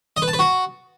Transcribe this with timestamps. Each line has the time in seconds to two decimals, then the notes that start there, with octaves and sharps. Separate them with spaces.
0.17 D#5
0.22 B4
0.28 A5
0.33 B4
0.39 F#4